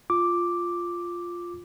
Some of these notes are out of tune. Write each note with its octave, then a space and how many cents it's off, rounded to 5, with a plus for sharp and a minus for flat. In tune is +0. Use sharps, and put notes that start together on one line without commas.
F4 +0 D6 +0